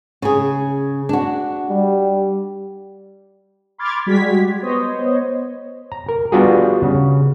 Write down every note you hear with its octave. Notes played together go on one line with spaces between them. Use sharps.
C#3 G#4
D4 F#4
G3
B5 C6 D6 F6 G#6 A6
G3 G#3 F#4 G#6 B6
B3 C5 C#5 D#5
A#5
A#4
G3 B3 D4 F4 F#4 G#4
C#3